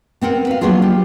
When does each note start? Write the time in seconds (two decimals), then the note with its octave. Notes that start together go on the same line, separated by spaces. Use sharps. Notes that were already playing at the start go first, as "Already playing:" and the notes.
0.21 B3 C4 A#4 F#5
0.47 B4 F5
0.61 F#3 A#3 B3 D4 F4 G#4
0.82 G4